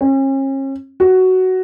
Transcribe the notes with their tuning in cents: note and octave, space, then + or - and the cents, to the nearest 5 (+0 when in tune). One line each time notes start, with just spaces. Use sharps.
C#4 -40
F#4 +10